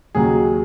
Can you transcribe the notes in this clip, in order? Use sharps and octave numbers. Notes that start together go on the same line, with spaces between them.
D#2 C#3 F#3 G#4